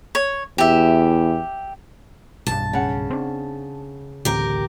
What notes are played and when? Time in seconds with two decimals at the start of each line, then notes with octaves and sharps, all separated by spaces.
0.15 C#5
0.58 E2 G4 E5
2.47 B1 G2 A5
2.73 C#3 F#5
3.10 C4 D4
4.25 A1 D2 C4 G4 A#4